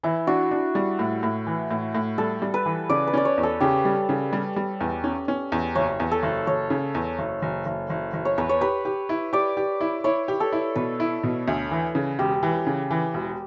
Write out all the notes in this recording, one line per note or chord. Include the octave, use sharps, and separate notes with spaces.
E3 E4
D4 F#4
D4
G3
A2
A2
E3
A2
A2
G3 A4
G3
B4
E3
C#3 D5
B4
C#4 D5
C#5
E2
A4
C#3 G4
G3
C#3
G3
G3
E2
C#4
C#4
E2
F#1 C#5
E2
A4
F#1
F#1 C#5
C#3
E2
F#1
F#1
F#1
F#1
F#1
C#5
E2 B4
C#5
G4 B4
G4
E4
G4 D5
G4
E4
E4 C#5
G4
A4
E4
B2 B4
E4
B2
D2
E3
C#3
E1 G4
E3
C#3
E3
E1